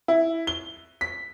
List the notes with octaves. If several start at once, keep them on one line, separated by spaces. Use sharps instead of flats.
E4
G7
B6